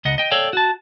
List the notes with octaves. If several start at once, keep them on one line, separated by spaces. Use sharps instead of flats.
C#2 D#5 F#5
D#5 G5
A4 C#5 D5 F5 G5
F#4 A5